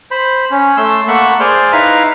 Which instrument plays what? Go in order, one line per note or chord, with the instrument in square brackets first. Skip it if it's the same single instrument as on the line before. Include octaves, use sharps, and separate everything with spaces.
[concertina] C5 B5
C#4
A3 C6 E6
A3 A#3 F#5 B5 C#6 E6
G#4 C5 D5 C6 F6
D#4 E4 B4 E5 F5 A#5